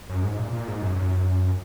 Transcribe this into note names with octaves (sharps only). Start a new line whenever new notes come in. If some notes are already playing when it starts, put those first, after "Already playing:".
F#2
G#2
A#2
A#2
G#2
F#2
F#2